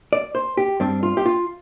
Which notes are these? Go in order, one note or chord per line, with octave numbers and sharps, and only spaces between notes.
D5
C5
G4
G2 G3 C4 D4
F4
G4
F4